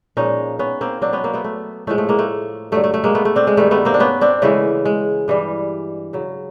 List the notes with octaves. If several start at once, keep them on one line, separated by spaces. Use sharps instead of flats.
A#2 F3 G#3 C#4 D#4
B3 C#4
A#3 C4
B2 F#3 C4 D4
B3 C#4
A#3 C4
A3 B3
A3
A2 F3 G#3 A3
A3
G#3 A#3
A3
G2 D3 F#3 A3
A3
A3
G#3 A#3
A3 B3
A3
C4 D4
G#3
G2 D#3 G3 A3
A3 B3
A#3 C4
D4
B3 C#4
C4 D4
C#3 E3 G#3 A3
G#3
G2 E3 G3
C#3 F#3